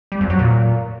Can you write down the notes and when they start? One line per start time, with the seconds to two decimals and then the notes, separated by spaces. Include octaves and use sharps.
0.12 G3
0.21 F2
0.30 F#3
0.39 A#2